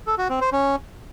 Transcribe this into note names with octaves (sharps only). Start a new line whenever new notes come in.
A4
F#4
C4
C5
C#4